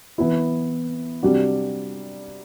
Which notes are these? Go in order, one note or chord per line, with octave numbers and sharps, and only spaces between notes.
E3 B3 E4
C3 G3 D4 F#4